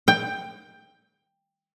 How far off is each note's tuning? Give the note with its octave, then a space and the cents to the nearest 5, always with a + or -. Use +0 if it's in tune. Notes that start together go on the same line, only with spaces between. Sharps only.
G5 +10